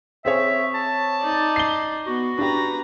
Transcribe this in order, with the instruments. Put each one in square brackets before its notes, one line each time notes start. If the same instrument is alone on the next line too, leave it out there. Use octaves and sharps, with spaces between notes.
[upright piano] C4 G#4 C#5 [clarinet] E5
[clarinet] A5
[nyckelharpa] D#4 D5
[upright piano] C7 G7
[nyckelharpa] B3 [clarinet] F#4
[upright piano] D4 G4 [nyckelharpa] B4 A#5